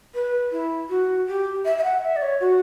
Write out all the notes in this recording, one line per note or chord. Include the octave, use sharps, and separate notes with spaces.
B4
E4
F#4
G4
E5
E5
F#5
E5
D5
C#5
F#4